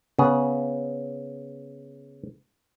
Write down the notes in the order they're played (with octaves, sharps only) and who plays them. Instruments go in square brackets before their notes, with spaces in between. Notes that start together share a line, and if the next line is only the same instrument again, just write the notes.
[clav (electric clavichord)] C#3 B3 G#4